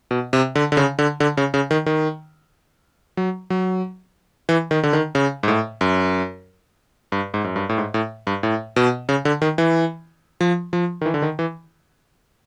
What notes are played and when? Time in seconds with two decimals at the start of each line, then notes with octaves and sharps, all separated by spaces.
0.11 B2
0.33 C3
0.55 D3
0.72 D3
0.77 C#3
0.99 D3
1.20 D3
1.37 C#3
1.54 C#3
1.71 D#3
1.86 D#3
3.17 F#3
3.50 F#3
4.49 E3
4.71 D#3
4.83 D3
4.93 D#3
5.15 C#3
5.43 G#2
5.48 A2
5.81 F#2
7.12 G2
7.34 G#2
7.44 F#2
7.56 G2
7.69 A2
7.78 G#2
7.94 A2
8.27 G2
8.43 A2
8.76 B2
9.09 C#3
9.25 D3
9.42 D#3
9.58 E3
10.41 F3
10.73 F3
11.01 D#3
11.06 E3
11.14 D3
11.22 D#3
11.39 E3